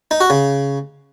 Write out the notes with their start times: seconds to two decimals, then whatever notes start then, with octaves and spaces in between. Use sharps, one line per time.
0.11 D#4
0.21 F#4
0.30 C#3